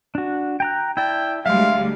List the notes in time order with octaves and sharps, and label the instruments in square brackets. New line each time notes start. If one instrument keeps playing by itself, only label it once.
[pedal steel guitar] D4 F#4
G5 A#5 F#6
[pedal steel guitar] E4 D5 A5 [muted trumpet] G5
[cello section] D2 G3 G#3 [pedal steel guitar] E5 C6 [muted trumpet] F5